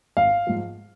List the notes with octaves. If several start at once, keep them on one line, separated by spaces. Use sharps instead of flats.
G#1 F5
G#2 F3